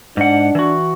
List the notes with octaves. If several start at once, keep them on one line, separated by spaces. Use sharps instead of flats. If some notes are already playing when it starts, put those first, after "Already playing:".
G#2 D4 F#5
E3 F#4